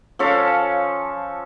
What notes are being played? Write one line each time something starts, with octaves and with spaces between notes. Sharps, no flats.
F3 C#4 A4 F5